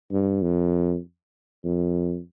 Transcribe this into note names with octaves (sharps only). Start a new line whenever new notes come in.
G2
F2
F2